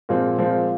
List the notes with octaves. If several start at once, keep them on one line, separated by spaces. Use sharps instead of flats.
A#2 F3 G#3 C4
A#2 F3 G#3 C4